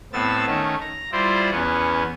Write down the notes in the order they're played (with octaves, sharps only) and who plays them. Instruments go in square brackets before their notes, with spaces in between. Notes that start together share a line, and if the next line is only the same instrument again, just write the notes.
[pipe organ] A2 B3 C4 E6 A6
D#3 A3 C#4
A#5
G3 E4 F4 C5 D5
E2 B3 C#4